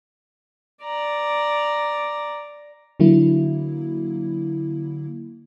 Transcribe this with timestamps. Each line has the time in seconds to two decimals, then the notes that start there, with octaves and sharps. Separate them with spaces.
0.83 D5 A#5
3.00 D3 F#3 A#3 E4